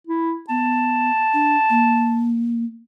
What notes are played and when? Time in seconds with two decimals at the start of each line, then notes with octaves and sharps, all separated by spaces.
0.07 E4
0.49 B3 A5
1.34 D4
1.70 A#3